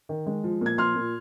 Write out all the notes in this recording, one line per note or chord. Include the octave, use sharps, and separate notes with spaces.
D#3
G#3
F3
A#2
G#6
F3 C6 F6
A#2